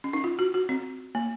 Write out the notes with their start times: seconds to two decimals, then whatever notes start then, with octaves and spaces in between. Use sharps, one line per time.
0.04 C#4
0.13 D#4
0.24 F4
0.39 F#4
0.54 F#4
0.69 C4
1.15 A#3